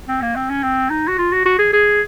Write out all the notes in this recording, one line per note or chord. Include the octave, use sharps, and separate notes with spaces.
C4
A#3
C4
C#4
C4
D#4
F#4
F4
F#4
F#4
G#4
G#4